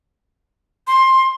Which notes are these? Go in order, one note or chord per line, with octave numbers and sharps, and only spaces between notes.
C6